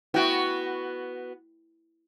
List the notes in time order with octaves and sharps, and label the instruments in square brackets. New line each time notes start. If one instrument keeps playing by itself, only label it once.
[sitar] B3 F#4 [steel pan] E4 G5